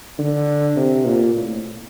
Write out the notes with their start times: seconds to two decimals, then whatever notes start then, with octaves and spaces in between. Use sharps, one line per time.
0.18 D3
0.76 C3
1.05 A#2
1.35 A2